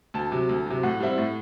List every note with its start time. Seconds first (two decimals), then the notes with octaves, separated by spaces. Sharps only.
0.14 D2 A5
0.32 C3 F#3
0.49 D2
0.66 C3 F#3
0.83 A2 F#5
1.00 G3 C4 E4
1.18 A2